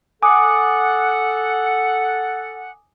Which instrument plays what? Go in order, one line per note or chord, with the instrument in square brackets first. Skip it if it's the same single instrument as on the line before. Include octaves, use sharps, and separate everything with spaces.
[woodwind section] A4 F#5 [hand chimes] G#5 D6 D#6